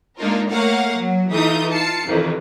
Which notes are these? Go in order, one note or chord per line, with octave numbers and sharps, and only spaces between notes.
G#3 A#3 D4 D#4 F4 A#4
A3 A#3 A#4 C#5 F5 F#5
F#3
E3 D#4 F4 A4 D#6 G6
F4 A5 C7 C#7
F2 C3 D#3 E3